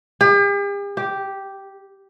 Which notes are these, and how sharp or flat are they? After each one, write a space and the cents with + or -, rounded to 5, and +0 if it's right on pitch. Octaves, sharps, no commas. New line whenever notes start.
G4 +45
G4 -5